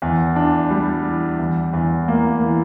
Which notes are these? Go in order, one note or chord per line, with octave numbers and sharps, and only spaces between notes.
E2
D4
G3
E3
E2
E2
A#3
E3